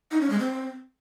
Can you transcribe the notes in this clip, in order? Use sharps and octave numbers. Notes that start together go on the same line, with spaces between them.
D#4
C#4
G#3
C4